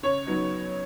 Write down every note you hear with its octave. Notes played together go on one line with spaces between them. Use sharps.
C#3 C#5
F#3 B3 D#4